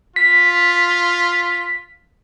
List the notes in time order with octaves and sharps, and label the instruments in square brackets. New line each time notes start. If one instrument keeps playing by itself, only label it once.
[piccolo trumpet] F4 [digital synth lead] B6